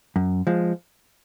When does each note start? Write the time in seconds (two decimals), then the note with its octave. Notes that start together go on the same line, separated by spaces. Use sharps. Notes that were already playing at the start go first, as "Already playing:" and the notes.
0.16 F#2
0.47 F3 G#3